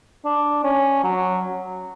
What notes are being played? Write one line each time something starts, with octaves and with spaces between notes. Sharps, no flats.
D4
C#4
F#3